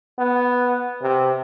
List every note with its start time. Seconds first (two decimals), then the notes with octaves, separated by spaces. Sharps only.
0.19 B3
1.02 C3